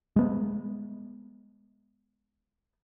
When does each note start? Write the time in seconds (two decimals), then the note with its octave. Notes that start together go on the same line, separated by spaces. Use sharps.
0.16 G#3 B3